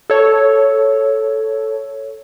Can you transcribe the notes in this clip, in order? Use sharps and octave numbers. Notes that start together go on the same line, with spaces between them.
A4 C#5